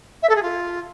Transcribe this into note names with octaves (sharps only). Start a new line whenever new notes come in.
E5
A4
G#4
F4